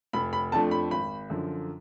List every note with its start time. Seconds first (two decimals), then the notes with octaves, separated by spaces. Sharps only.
0.13 F1 B5
0.33 B5
0.52 F2 F3 A3 D4 A5
0.71 B5
0.91 G#1 B5
1.30 F#2 D3 F3